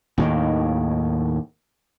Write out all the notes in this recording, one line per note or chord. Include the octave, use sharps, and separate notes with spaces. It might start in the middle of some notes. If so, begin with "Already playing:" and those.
D#2 A2 D#3